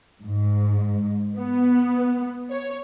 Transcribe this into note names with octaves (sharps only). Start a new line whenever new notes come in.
G#2
B3
C#5